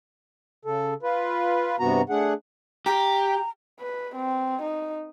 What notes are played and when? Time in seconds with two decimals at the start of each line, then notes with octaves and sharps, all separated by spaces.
0.65 C#3 A4
1.03 F4 B4
1.80 G2 C3 B3 F#4 A#5
2.09 A3 D4 G#4 F#5
2.86 G4 A#5
3.80 B4
4.15 C4
4.62 D#4